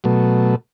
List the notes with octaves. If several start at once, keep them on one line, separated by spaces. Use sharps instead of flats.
B2 F#3 A3